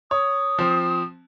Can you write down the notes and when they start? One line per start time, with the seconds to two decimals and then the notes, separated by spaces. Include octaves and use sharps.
0.11 C#5 D#6
0.59 F3 C4